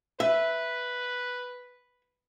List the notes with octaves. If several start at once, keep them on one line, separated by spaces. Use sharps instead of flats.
B4 E5